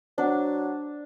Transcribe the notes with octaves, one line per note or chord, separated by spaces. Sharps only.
F#3 D4 C5 F#5